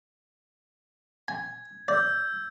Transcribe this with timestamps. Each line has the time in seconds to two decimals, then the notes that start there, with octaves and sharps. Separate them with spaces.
1.28 G#5 G#6
1.88 D5 E6 G6